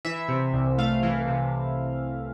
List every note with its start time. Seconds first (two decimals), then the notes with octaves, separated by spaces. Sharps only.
0.05 E3 E5
0.28 C3
0.53 C2
0.78 A3 F5
1.03 E3
1.28 C3